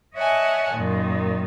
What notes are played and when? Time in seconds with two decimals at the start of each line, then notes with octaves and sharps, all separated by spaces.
0.15 C#5 D#5 E5 F#5 G#5 A5
0.72 F#2 A#2 D#3